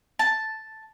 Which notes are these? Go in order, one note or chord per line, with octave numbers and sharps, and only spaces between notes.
A5